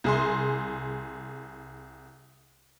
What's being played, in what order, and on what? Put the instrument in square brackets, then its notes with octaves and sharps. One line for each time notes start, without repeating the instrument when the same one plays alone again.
[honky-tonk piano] C2 G#4 C6